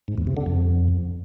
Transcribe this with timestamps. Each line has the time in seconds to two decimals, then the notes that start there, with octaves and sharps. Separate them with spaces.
0.08 G#2
0.18 E2
0.27 C3
0.37 D3
0.46 F2